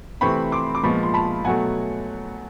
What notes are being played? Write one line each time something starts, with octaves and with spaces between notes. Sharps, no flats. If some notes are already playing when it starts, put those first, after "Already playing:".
C3 E3 A3 C4 B5 C#6
C6 D6
D6
A#2 F3 G#3 B3 B5 C#6
C6
A5 B5
B2 F#3 A3 F#5 G#5